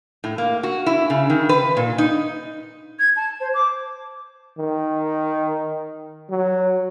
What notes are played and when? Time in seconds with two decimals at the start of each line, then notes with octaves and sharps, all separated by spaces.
0.24 A2
0.38 A#3
0.63 F#4
0.86 E4
1.10 C#3
1.30 D#3
1.49 B4
1.77 A#2
1.98 D#4
2.99 G#6
3.16 A5
3.40 C5
3.54 D6
4.58 D#3
6.30 F#3